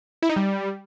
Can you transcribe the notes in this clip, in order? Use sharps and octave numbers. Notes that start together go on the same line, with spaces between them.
E4
D#4
G3